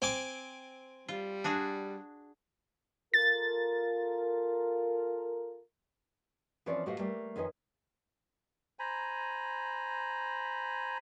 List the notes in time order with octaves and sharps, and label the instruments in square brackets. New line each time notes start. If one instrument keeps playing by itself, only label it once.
[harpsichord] C4 G#5 D6
[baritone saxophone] G3 [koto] F4
[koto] D4 F#4 G#4
[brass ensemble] F4 A4 A#4 [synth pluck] A6
[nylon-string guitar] E3 F3 C4 C#4 C#5 D5
A2 F#4 G4 D#5 F5
G3 A3 A#3 G5
F2 D#3 B4 C#5 D#5 G#5
[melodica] C5 G#5 A#5 B5